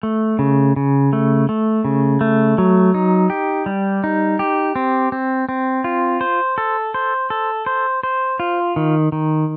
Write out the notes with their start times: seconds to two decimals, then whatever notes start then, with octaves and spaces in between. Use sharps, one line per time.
0.03 A3
0.39 C#3
0.76 C#3
1.13 A3
1.49 A3
1.85 C#3
2.21 A3
2.58 F#3
2.94 D#4
3.30 G4
3.66 G3
4.04 D#4
4.39 G4
4.76 C4
5.12 C4
5.49 C4
5.84 F4
6.21 C5
6.58 A4
6.94 C5
7.30 A4
7.66 C5
8.03 C5
8.40 F4
8.76 D#3
9.12 D#3